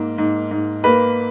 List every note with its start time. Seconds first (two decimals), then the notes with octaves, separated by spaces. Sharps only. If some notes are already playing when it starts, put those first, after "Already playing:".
Already playing: G#2 A#3
0.18 G#2
0.51 G#2
0.84 A#3 B4